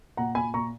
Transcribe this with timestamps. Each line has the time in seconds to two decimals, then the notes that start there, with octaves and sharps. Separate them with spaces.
0.17 A#2 F#5 A#5
0.35 A#2 G#5 B5
0.54 A#2 A#5 C#6